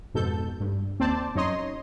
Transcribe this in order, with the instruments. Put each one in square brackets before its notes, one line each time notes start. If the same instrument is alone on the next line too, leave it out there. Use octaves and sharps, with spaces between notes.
[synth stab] F2 G#2 B2 A4 G6
G2
D#2 C4 C5 D5 A5
F#2 D#4 C#5 D#5 C6